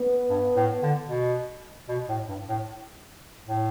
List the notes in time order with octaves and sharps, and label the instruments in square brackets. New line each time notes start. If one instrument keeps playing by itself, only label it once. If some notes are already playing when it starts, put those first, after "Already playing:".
Already playing: [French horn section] B3
[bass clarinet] G2
A2
D3
B2
B2
A2
G2
A2
A2